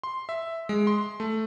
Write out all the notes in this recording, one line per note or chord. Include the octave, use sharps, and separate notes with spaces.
C6
E5
G#3
C6
A3